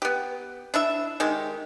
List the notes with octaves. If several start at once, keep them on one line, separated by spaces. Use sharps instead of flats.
B3 G4
D4 E4 E5
D#3 G#3 G4